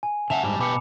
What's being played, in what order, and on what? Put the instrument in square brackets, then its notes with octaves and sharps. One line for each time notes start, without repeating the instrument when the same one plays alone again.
[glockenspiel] G#5
[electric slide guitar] C#3 E5 F#5 [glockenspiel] A5 E7 F7
[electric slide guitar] G#2 G3
[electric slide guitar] B2 G4 B4 [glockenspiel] B5 D6 C#7